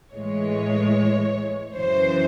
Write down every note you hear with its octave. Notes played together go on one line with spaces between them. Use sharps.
A2 E3 G#3 C#5
F#2 C#3 E3 C5